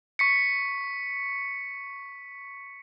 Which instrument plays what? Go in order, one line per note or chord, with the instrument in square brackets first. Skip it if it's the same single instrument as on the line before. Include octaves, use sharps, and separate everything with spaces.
[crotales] C#6 B6 C#7